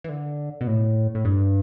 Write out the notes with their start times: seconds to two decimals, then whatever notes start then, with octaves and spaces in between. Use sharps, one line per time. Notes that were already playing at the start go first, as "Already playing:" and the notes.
0.04 E3
0.09 D3
0.61 B2
0.67 A2
1.15 A2
1.25 G2